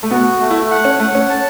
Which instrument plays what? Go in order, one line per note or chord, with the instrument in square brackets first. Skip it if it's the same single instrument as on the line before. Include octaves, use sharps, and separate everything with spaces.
[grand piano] A3
[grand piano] B3 [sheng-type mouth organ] F#4
[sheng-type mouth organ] A3
[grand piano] E4
[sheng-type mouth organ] F#5
[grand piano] C#4
[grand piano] A3 [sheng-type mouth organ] F#5
[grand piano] C#4
[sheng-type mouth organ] A5